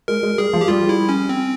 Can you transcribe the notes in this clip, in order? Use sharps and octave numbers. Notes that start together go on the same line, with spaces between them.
G#3 A#4
G#3
G3 G#4
F3
G4
G3 F4
E4
C#4
C4